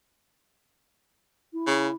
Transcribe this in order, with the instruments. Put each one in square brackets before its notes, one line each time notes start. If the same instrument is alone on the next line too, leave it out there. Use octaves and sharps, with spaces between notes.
[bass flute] E4
[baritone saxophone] C#3